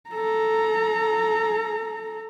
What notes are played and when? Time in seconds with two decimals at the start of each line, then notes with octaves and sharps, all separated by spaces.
0.10 A4 A#5